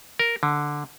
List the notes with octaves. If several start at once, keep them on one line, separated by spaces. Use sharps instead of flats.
A#4
D3